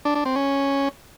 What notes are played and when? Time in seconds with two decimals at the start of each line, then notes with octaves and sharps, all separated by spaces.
0.05 D4
0.15 D4
0.25 C4
0.36 C#4